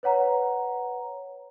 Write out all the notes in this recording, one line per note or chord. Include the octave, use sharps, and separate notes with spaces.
B4 C#5 F#5 A#5